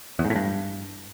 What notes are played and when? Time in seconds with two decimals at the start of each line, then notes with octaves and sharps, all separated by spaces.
0.19 E2
0.25 G#2
0.30 A2
0.36 G2